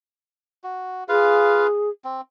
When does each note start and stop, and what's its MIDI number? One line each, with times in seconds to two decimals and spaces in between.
0.64 1.04 66
1.09 1.67 65
1.09 1.89 68
1.09 1.67 71
1.09 1.67 77
2.04 2.21 60